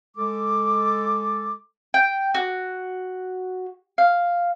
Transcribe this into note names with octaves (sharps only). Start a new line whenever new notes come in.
G#3 A4 D6
G5
F#4
F5